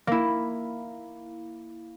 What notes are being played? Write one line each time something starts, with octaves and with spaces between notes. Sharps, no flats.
A#3 E4